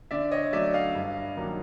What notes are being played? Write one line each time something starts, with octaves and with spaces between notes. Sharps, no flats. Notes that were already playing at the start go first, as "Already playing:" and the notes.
D3 D5 E5
C#5 D#5
F#3 A3 D5 E5
D#5 F5
G2
D#3 F#3 A#3 D#4